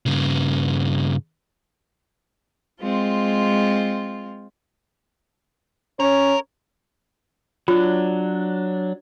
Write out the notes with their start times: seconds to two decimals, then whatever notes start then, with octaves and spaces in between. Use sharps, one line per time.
0.06 G2 C#3
2.80 G#3 C4 F4
6.00 C#4 A#4 C#5
7.68 F#3 D4 F4